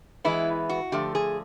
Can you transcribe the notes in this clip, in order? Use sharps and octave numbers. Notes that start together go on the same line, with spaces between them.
E3 G#3 B3 E4
F#4
D3 F3 A3 G4
G#4